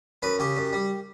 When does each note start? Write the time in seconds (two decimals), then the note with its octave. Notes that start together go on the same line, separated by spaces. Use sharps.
0.22 F#2 B4
0.39 C#3 G4
0.57 F#2
0.73 G3